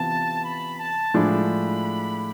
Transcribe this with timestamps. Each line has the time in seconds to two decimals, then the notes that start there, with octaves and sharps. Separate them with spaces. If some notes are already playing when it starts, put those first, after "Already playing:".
Already playing: C3 E3 B3 F4 A5
0.44 B5
0.79 A5
1.14 A2 F3 G#3 D4 B5